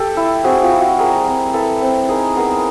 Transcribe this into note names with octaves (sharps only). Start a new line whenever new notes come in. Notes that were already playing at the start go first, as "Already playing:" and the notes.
Already playing: G4 A4
E4
C4 F#4 G#4
F4 G4
E4
F#4
G3 G#4 A#4
C4
E4 A4 B4
C4
D#4 G#4 A#4
B3 G#4 A#4